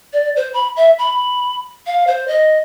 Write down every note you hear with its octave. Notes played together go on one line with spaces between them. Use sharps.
D5
C5
B5
E5
B5
F5
C5
D#5